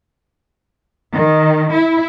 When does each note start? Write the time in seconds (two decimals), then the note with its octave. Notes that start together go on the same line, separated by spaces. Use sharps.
1.14 D#3
1.74 E4